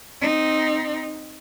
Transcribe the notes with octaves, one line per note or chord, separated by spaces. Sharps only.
C4 D#4